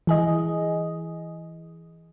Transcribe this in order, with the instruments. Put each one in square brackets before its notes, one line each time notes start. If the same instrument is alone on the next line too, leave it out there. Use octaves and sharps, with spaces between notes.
[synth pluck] E3 G#4 D#5